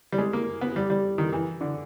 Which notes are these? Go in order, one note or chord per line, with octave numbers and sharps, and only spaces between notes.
G3
G#3
A#3
B3
G3
G3
D#3
E3
D3